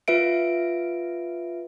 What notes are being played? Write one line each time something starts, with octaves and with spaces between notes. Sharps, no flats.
F4 B4 E5 D7